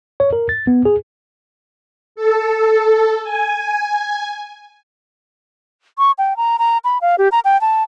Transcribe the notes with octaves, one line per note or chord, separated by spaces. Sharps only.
C#5
A#4
A6
B3
G#4
A4
G#5
C#6
G5
A#5
A#5
B5
F5
G4
A#5
G5
A5